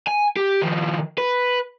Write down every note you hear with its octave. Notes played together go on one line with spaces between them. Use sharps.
G#5
G4
D#3 F3
B4